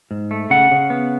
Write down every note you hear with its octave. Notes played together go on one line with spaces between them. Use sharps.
G#2
A3
C#3 F#5
C#3
B3